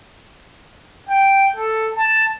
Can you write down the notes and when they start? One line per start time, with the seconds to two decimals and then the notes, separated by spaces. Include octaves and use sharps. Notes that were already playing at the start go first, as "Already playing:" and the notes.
1.10 G5
1.56 A4
1.96 A5